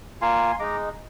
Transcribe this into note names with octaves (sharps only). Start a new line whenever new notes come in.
A#3 F4 G#5 C6
G#3 D#4 A#5 D6